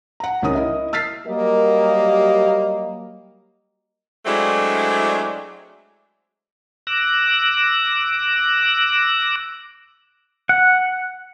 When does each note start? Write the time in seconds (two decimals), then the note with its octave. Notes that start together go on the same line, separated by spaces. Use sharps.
0.20 F#5 A#5
0.43 C2 C#3 C#4 D#4 A#4 D#6
0.54 E4 A#4 D#5 E5
0.93 E6 F6 A6 B6 C7
1.27 F#3 G3 A#3 G4 A#4 D#5
4.26 F#3 G#3 A3 C4 D4 E4
6.87 D6 E6 F#6 A#6
10.49 F#5